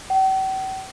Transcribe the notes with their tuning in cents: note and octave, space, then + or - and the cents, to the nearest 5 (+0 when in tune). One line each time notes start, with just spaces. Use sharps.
G5 -45